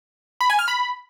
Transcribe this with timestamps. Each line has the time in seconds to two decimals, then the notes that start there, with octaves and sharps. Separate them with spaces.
0.41 B5
0.50 G#5
0.59 F6
0.68 B5